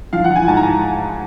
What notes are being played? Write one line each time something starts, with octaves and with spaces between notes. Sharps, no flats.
F3 F5
F#5
F3
G#5
G#2 A5
A#5